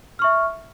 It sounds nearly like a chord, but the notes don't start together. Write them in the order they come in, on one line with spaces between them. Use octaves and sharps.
F6 C#6 E5